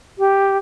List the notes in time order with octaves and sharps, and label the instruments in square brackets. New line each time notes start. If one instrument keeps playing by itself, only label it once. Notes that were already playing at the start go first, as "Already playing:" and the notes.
[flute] G4